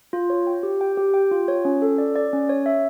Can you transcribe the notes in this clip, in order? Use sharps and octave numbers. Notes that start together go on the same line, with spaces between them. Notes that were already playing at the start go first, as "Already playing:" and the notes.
F4
C#5
G5
G4
G5
G4
G5
F4
C#5
C#4
A4
D5
D5
C#4
C#5
E5